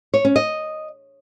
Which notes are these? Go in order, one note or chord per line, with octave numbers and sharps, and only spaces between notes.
C#5
C#4
D#5